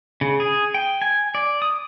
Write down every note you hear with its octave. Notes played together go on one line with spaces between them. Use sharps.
C#3
G#4
G5
G#5
D5
D#6